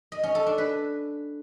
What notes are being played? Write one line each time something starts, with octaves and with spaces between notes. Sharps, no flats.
D#5
C#4
A4
D4
B4